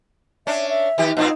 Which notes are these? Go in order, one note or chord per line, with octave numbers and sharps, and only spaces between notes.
C#4 D4 E5
E5
D#3 G4
A#2 C4 D#4 F4